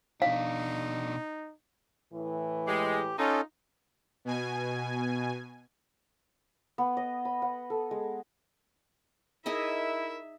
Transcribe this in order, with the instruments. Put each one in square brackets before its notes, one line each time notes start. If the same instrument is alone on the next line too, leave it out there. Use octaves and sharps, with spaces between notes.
[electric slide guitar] B2 D4 [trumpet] D#4 [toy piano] F5
[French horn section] A2 E3
[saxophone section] G#3 [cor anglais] G4
[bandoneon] C#4 A4 [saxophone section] D#4 [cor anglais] F4
[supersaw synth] B2 G#5
[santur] B3
D#5
B5
F#5
A4
G#3
[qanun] D#4 G#4 D#5 [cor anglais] E4 [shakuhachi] A#4 [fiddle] E5